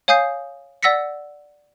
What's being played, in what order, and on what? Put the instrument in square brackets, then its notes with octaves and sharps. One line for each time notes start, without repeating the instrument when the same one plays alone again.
[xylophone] C#5 F5 G#5 D#6 G6 C7
D5 F#5 E6 A#6 B6 C#7